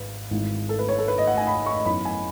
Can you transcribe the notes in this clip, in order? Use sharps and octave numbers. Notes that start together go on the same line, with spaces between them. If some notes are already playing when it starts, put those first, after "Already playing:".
Already playing: G#1 B4
G#1 G#2 E3
A4
B4
C#5
A4
B4
D#5
F#5
G#5
B5
C#6
F#2 E3 B3 D#4 B5
G#5